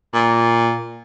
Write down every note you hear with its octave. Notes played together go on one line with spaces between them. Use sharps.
A#2